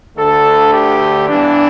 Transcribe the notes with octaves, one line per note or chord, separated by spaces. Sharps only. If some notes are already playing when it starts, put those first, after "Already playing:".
D2 D3 A3 A4
G4
G2 E3 B3 D4